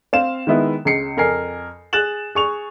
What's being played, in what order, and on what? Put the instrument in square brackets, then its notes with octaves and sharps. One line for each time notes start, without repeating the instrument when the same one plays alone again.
[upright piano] C4 F5 E7
D#3 G#3 B3 E4
C#2 C#3 C7 C#7
F2 A#4 G#5 C7
G#4 F#6 A6 E7 F#7
G#4 C#6 F7